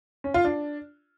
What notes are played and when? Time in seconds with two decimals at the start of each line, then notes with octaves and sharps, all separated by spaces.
0.24 C#4
0.34 F4
0.45 D4